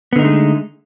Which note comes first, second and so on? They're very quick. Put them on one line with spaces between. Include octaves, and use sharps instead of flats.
B3 D3 D#4 A3 G#3